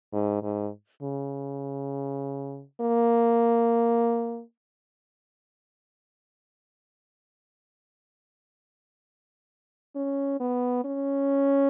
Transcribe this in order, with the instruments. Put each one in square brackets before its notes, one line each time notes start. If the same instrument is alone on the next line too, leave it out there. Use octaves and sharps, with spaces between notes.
[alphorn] G#2
G#2
C#3
A#3
C#4
B3
C#4